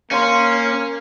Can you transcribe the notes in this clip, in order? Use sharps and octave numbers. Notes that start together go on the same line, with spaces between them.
A#3 C#4 F5 C6